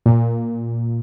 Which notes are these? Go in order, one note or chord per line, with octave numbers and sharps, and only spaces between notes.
A#2